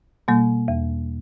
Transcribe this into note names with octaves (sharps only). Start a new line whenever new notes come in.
B2 G3 A#3
E2